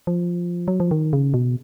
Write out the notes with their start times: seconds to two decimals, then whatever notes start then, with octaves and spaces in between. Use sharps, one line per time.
0.07 F3
0.68 F#3
0.80 F3
0.91 D#3
1.13 C#3
1.34 B2